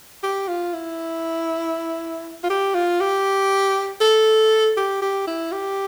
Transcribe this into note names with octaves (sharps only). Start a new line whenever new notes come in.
G4
F4
E4
F4
G4
F4
G4
A4
G4
G4
E4
G4